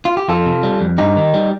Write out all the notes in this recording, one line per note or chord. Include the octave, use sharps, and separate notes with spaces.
F4
G4
F2 F4 A4
C3
G3
F2
G2 D#4 G4
D#3
G3